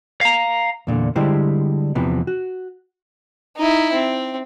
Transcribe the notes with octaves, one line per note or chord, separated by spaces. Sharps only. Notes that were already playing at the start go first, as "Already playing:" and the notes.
F5 A#5
E2 A#2 D3
D3 G3 G#3 E4 G4 C5
E2 C3 E3 F3 B3
F#4
D#4 E4
C4